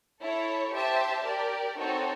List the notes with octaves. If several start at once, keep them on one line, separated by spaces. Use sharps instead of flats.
E4 A4 C#5
G4 C5 E5 A5
G4 A#4 D5
C4 D#4 F#4 A4 C#5